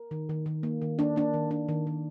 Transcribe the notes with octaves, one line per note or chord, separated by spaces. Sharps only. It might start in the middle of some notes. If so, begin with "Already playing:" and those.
Already playing: A#4
D#3
D#3
D#3
A#3
D#3
A#3 D4
A#3 D4
D#3
D4
D#3
D#3